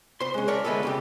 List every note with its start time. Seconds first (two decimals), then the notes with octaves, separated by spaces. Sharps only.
0.20 C5 C6
0.34 G#3 C#4
0.48 A#4 C#5 D5 E5 A5
0.64 D3 G#3 A3 B3 A4
0.83 F2 C#3 G4